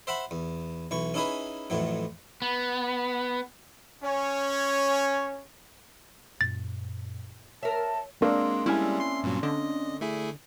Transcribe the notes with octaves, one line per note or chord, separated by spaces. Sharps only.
C5 E5 F#5 B5
E2
B1 E3 C#6
C#4 D#4 E4 G#4 B4
F2 A2 E3 F#3
B3
C#4 C#5
F#2 A#2 A6
A#4 C#5 E5 A5
G#3 A#3 C4 D4
G3 G#3 C4 C#4 E4 G#5
C6 C7
G2 A#2 F#3
D3 D#5
A3 E4 G#4